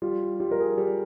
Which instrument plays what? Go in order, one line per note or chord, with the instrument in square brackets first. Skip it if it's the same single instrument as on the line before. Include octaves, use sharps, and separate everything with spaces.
[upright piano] G3 [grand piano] F4
[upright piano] G3 [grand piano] F4
[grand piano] A#4
G#4
[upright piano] G3